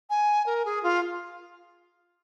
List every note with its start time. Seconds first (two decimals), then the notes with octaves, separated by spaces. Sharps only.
0.10 G#5
0.46 A#4
0.65 G#4
0.83 F4